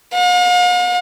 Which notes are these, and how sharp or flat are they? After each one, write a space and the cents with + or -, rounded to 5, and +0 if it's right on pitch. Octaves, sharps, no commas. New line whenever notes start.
F5 +45